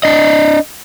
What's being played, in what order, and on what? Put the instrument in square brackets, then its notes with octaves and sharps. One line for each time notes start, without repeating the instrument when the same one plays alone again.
[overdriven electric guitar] D4 D#5